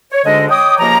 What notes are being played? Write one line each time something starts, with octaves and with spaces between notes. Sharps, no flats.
C#5
D2 G#2 D3 G#3 D4 D#5
C#5 D#5 G5 D6 D#6
C#2 C3 F3 A#3 D#5 A#5